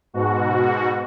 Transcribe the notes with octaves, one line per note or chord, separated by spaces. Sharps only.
G#2 B2 F#4